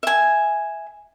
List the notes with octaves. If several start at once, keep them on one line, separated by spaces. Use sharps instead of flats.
E5 G#5